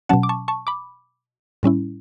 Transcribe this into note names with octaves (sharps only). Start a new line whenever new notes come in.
B2 F#3 C#4 F#5 A5
D6
A5 C#6
A5 C#6
B5 D6
A2 G3 C#4 E4